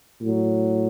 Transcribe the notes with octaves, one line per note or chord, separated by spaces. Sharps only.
A2 F#3